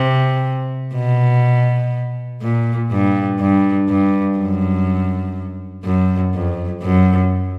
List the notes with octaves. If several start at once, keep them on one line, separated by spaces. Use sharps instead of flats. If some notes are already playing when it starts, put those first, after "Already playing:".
Already playing: C3
B2
A#2
G2
G2
G2
F#2
F#2
F2
F#2